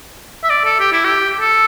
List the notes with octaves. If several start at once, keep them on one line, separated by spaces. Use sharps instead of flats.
E5
D5
A4
G4
E4
G4
A4